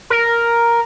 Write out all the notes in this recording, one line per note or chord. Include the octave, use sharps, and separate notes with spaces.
A#4